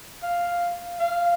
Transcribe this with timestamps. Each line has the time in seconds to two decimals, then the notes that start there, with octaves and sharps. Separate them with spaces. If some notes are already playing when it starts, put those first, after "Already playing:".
0.23 F5
1.00 F5